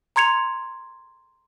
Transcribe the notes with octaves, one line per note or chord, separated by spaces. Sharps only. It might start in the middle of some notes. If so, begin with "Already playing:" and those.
A#5 C6 G#6 C#7 F7